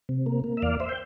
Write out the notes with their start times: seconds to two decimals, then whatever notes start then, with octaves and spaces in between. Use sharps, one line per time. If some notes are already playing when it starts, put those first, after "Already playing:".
0.09 C3
0.26 A#3
0.44 A#3
0.57 E5
0.62 E2 D5 F5
0.80 C5 E5
0.89 G5